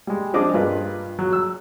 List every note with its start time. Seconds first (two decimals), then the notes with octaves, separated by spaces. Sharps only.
0.07 G3 G#3
0.34 F3 C4 D4 G#4 D#5 D6
0.54 G2 F4 A#4 B4
1.19 F#3
1.33 E6